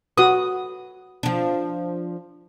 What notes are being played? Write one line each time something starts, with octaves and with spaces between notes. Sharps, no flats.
F#4 B4 D#6
F3 D4